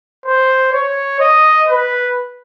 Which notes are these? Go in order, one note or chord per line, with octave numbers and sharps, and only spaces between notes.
C5
C#5
D#5
B4